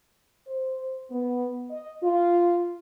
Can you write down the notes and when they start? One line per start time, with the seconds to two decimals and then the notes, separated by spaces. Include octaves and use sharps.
0.47 C5
1.11 B3
1.70 D#5
2.02 F4